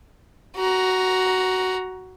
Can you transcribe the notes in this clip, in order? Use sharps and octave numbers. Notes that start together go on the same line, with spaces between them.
F#4 A#5